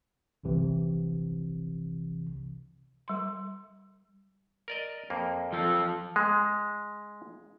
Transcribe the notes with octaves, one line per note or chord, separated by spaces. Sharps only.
G1 C2 C3 E3
G3 C6
A#4 D5 D#5
F2 A#3
F3 A4
G#3